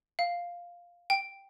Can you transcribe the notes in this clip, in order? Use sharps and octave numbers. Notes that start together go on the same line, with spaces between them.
F5
G5